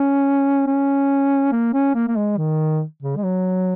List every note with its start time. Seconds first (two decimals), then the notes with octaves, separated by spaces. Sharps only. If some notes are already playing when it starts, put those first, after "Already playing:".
Already playing: C#4
0.67 C#4
1.52 A#3
1.74 C#4
1.95 A#3
2.08 A#3
2.17 G#3
2.38 D#3
3.03 C#3
3.17 G#3
3.24 F#3